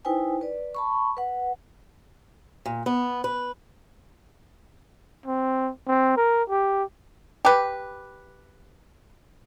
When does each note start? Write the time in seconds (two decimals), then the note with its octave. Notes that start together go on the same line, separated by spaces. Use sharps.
0.05 D#4 E4 B4 C5 G5 G#5
0.41 B4 D5
0.75 A5 B5 C#6
1.17 B4 F#5
2.65 A#2
2.86 B3
3.24 B4
5.26 C4
5.88 C4
6.17 A#4
6.49 G4
7.45 G4 B4